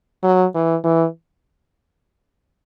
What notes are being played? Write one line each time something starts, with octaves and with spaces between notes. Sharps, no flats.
F#3
E3
E3